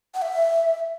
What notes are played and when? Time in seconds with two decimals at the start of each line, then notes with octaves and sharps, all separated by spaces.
0.14 F#5
0.22 E5